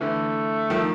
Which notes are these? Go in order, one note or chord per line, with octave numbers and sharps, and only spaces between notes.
D3 E3 A3
D#3 F3